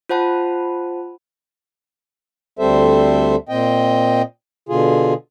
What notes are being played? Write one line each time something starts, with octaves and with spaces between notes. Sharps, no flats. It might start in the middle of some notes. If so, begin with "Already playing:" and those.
F4 C5 F#5 A5 B5
D2 G3 C4 A4 C5 E5
A#2 C4 D#5 G5
B2 D3 F4 G#4